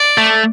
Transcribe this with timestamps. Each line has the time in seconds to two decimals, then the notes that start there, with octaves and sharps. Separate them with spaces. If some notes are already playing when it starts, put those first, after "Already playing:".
Already playing: D5
0.18 A3